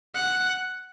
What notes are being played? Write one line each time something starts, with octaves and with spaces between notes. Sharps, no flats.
F#5